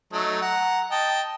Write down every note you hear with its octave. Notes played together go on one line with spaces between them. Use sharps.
F#3 A3 D#4
F#5 A#5
D#5 G5 A5